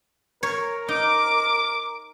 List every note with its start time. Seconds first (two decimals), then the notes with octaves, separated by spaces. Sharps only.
0.43 A#4 C#5
0.88 D#4 D6